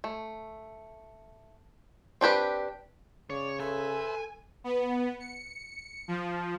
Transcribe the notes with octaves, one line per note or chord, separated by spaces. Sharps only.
A3
C4 D4 G4 B4
C#3 C#5 D5
A4 B4 C5 E5 G#5
B3
C#7
F3